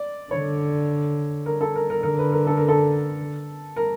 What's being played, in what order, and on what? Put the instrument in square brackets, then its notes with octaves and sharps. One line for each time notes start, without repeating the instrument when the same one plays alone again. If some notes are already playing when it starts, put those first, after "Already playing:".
Already playing: [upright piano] D5
[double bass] D3 [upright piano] C#5
[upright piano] A#4
A4
A#4
A#4
[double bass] D3 [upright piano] A#4
[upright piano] B4
A#4
A4
A#4
A4
A#4